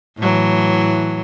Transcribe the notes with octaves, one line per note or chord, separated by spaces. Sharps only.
A2 E3 F#3